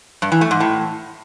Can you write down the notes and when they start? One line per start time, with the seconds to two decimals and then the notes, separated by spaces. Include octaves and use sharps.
0.22 G2
0.32 E3
0.41 A3
0.51 G#2
0.60 A2